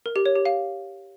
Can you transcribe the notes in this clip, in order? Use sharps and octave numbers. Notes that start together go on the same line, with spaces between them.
A#4
G4
C#5
G4
F5